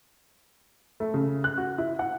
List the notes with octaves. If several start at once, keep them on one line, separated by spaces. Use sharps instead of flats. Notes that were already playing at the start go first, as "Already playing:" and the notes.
A3
C#3
F#6
F#4
E4
F#5